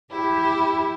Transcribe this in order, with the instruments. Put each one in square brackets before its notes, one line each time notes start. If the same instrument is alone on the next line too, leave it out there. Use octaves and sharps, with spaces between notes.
[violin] E4 [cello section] G4